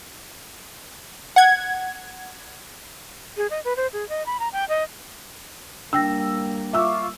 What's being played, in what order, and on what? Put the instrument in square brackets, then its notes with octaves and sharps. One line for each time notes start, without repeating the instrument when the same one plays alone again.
[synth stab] F#5 G#6
[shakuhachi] G#4
D#5
B4
C5
G#4
D#5
B5
A#5
G5
D#5
[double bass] G3 A#3 [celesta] D4 G5 A#6 [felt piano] E6
[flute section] F4 C#6 D6 [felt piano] E5 E6